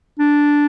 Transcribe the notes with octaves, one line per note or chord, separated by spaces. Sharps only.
D4